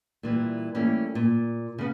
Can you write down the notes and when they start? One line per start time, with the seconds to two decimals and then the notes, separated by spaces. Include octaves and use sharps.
0.23 A#2 E3 G3
0.75 E3 G3 A3 A#3 C#4
1.15 A#2
1.78 C#3 B3